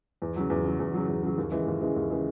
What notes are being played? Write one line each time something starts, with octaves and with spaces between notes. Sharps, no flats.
E2
C#3 F#3
E2
C#3 F#3
E2
C#3 F#3
E2
C#3 F#3
D#2
C#3 E3 G#3
D#2
C#3 E3 G#3
D#2
C#3 E3 G#3